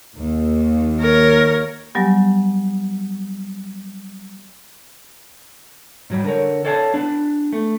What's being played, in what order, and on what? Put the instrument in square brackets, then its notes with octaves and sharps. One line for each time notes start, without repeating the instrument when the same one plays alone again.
[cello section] D#2
[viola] A#4 C#5
[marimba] F#3 G3 B3 G4 G#5
[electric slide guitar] G#2 F#3 G3
D3 A#4 C#5
A4 C#5 D5 F5 G5 A5
B3 D4
A3